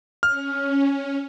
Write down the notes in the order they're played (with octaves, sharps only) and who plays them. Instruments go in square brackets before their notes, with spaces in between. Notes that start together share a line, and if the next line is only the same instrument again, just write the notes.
[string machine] C#4 [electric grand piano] F6